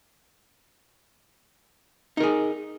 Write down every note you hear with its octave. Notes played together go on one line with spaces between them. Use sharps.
D#4 G#4 A#4